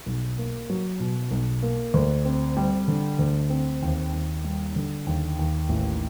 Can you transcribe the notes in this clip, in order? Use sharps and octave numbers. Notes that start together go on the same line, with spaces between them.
B1
A#3
F#3
B2
B1
A#3
D2
C4
G3
D3
D2
C4
D#2
D#2
G3
D3
D#2
D#2
A1